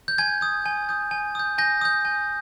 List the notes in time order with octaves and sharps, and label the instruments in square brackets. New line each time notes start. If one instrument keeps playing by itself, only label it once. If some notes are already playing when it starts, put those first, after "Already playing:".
[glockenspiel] G6
G#5 G#6
D#6 G6
G#5
D#6 G6
G#5
D#6 G6
G#5 G6 A#6
D#6 G6
G#5